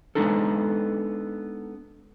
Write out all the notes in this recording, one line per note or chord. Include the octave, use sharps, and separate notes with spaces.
G#3 A#3 B3 D4 D#4 A4